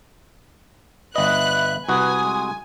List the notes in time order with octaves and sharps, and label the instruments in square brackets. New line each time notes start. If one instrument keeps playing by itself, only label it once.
[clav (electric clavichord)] G1 D#5 [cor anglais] B4 [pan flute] E5 [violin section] F#6
[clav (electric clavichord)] C2 F#4 [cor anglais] B4 [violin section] G#5 [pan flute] D#6
[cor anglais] G#3